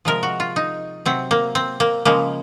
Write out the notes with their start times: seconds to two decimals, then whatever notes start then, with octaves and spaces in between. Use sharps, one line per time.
0.05 C3 F3 G#3 A#4
0.23 F#4
0.40 F4
0.56 D#4
1.06 C3 F#3 C4
1.31 A#3
1.55 C4
1.80 A#3
2.05 C#3 F3 G#3 A#3